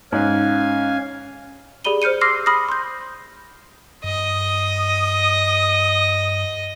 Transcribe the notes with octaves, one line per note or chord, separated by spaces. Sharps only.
G#2 C#4 F5 G#5
G4 G#4 D5 B5 D#7 G7
C5 F6 G6 C#7 D#7
C6 D6 E6 F6 A#6 C7
B5 D#6 F6 A#6
C6 G6
G2 D#5 D#6